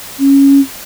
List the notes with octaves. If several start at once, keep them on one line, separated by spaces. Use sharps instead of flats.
C#4